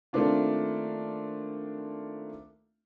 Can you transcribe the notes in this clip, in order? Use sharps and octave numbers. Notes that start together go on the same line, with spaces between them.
D#3 A3 A#3 C4 D4 F4